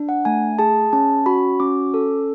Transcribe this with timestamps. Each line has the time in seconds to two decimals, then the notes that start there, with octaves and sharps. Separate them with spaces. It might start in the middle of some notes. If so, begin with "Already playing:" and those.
Already playing: D4
0.09 F#5
0.25 A3 G#5
0.59 G#4 A5
0.93 C#4 A5
1.26 F#4 B5
1.60 C#4 D6
1.94 A4